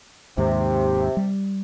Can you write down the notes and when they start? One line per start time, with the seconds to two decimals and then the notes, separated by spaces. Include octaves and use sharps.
0.38 D#2 G#2 C3
1.17 G3